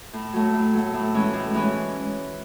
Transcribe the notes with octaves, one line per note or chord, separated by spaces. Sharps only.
A2
F#3 A3
A2
F#3 A3
A2
E3 G#3 C#4
A2
E3 G#3 C#4